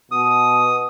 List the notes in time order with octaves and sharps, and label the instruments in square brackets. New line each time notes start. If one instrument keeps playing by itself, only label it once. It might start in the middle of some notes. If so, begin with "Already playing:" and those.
[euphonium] B2 [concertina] D#6